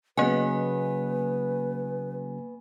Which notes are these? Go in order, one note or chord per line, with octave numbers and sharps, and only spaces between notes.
C#3 F#3 A#3 B3 B4 G#5